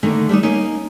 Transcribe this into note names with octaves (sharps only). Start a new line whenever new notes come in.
D3 D#3 A3 A#3
G3 A3 D4 D#4
A#3 C#4 D#4